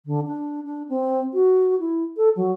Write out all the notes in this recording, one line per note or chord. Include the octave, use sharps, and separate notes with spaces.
D3
D4
D4
C4
F#4
E4
A4
F#3